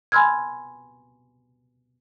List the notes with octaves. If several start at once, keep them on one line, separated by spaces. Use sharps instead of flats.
G#5 B5 C6 E6 F6 G#6